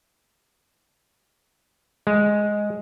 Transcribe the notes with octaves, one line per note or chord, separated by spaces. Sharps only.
G#3